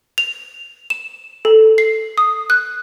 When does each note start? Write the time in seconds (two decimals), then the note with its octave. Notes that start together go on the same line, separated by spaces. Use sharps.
0.18 F7
0.90 E7
1.45 A4
1.78 C7
2.18 D#6
2.50 F#6